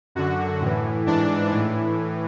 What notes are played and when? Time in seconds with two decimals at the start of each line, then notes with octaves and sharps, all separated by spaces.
0.15 F#2 D3 F#4
0.61 A2 E3
1.07 G#2 E3 D4
1.52 A2 E3